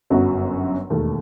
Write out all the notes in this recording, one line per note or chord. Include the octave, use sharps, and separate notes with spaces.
G1 F#2 F#3 B3 F#4
E1 D#2 D#3 A3